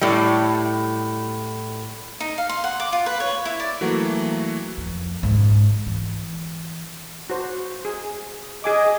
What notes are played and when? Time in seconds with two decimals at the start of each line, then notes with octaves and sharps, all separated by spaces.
0.01 A2 G3
2.20 D#4
2.38 F5
2.49 C6
2.64 F#5
2.80 D6
2.92 F4
3.06 B4
3.20 C#5
3.45 E4
3.60 D5
3.81 E3 F#3 A3 A#3 F#4
4.78 F2
5.23 G#2 C#3
5.86 E3
7.30 F#4 C5
7.85 G#4
8.64 G#4 D#5 G#5 D6